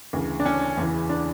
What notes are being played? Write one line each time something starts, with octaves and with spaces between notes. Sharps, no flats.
D2 C#3 E3
D4
C#4
E2 C#3 E3
D4